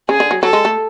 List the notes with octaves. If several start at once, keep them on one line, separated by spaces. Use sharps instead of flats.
C#3 G#4
D3
F#3
F#3 A4
G#3
A3